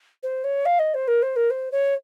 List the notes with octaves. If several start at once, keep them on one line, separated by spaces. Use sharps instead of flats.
C5
C#5
F5
D#5
C5
A#4
C5
A#4
C5
C#5